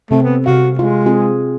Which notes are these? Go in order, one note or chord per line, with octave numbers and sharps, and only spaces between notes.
C3 A3 C4 A4
B3
C3 F#4 F5
G#3 F4
C4 F4 G#4